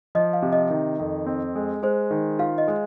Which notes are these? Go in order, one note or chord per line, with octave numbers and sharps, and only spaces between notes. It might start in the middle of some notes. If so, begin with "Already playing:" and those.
F3 D#5
F5
C3
D#5
D#3
F2
C4
G#3
G#3 C5
D#3
F4 F5
D#5
G#3